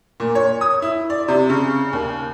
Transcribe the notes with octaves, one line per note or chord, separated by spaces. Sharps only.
A#2
C#5
D#6
E4
D5
C3
C#3
D#2